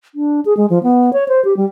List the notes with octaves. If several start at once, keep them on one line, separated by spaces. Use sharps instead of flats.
D4
G#4
G#3
F3
B3
C#5
C5
G4
G3